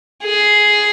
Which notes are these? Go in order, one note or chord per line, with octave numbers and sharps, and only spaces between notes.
G#4